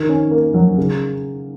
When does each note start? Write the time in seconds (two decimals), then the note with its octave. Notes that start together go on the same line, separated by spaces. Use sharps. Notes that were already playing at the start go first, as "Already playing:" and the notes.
Already playing: D#3
0.09 C#4
0.31 A#3
0.54 F#3
0.78 C#3